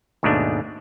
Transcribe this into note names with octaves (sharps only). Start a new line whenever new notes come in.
D#2 G#2 B2 G#3 A3 D4